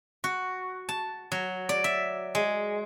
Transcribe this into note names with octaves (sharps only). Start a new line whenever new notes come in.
F#4
A5
F#3
D5
E5
G#3